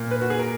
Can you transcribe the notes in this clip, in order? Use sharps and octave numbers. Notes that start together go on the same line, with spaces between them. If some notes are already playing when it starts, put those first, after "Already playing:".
Already playing: A#2
B4
F#4
G#4
A#4